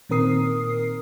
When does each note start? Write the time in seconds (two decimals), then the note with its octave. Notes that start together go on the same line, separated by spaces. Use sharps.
0.09 A#2 D#3 C4 A#4 D#6 C7